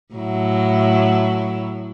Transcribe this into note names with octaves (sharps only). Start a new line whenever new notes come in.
A2 F#3 E4